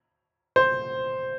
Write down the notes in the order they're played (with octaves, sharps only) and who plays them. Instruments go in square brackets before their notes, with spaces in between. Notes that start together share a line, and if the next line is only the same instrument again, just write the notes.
[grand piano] C5